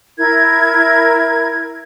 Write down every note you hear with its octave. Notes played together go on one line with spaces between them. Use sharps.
E4 A#4 G#6